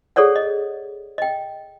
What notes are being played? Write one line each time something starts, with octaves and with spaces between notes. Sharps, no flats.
G#4 A4 C#5 D5 F#5
D#5
D#5 G5